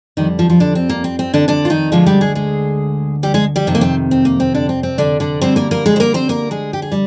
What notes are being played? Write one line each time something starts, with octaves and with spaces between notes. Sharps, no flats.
F2 D3 D#3 G3 D#4
F3 F4
F3 F4
D3 D4
C4
A#3
C4
C4
D3 D4
D3 D4
F4
D#3 D#4
D2 D3 F3 G#3 F4
G3 G4
G#3 G#4
G#3 G#4
G3 G4
G#3 G#4
G3 G4
F2 C3 D#3 C4
A#3
C4
C4
A#3
C4
D3 D4
C4
C4
D3 D4
D3 D4
D2 D3 G3 C4 C5
A#3 A#4
A#3 A#4
G#3 G#4
C5
A#3 A#4
C4 C5
A#3 A#4
G#3 G#4
G4
G#4
G3